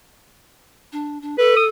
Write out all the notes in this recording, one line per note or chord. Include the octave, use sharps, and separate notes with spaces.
D4
D4
A4 B4
D#6